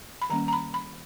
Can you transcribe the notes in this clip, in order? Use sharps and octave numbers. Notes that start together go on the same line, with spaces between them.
B5
D#3 G3 A#3 C#4 A#5
A#5
B5
B5